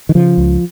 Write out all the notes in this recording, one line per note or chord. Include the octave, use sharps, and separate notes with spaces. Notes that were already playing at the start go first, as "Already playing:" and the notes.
D#3
C#3 F3
C#2